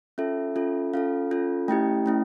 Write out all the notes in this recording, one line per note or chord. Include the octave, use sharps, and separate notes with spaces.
C#4 F4 A4 E5
C#4 F4 A4
C#4 F4 A4 F5
C#4 F4 A4
A3 C#4 E4 G4 G5
A3 C#4 E4